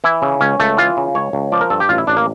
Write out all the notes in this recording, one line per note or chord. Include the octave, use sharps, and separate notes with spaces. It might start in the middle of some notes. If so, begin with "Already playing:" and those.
E3 E4
C#3
C#2 C#4
C#2 A3
E3 F4
C#3
C#2 C#5
C#2
F3 D5
A#4
G2 A4
G4
A1 F4
E4
A1 D4
A#3